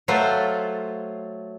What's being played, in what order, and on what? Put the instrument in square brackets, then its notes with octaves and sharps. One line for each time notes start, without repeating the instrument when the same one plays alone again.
[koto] F#3 A3 F4 C5